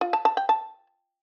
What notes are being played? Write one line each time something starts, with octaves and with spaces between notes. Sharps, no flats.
F4
A5
A5
G5
A5